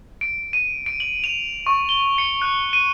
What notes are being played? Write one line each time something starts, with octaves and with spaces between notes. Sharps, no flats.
D7
D#7
D7
F#7
F7
C#6
G7
C#7
F#6
D#7